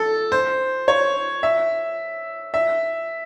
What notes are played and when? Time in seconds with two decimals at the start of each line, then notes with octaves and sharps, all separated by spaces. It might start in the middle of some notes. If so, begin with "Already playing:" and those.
Already playing: A4
0.32 C5
0.88 C#5
1.43 E5
2.54 E5